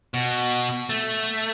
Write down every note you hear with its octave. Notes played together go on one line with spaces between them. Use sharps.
B2
A3